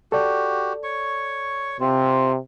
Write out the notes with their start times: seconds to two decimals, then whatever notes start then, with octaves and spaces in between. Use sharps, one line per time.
0.12 F#4 G4 A4 D5
0.84 C#5 C#6
1.80 C3 C4 F4